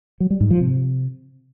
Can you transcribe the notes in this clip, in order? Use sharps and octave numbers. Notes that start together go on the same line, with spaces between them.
F#3
G3
G#2
F3
C3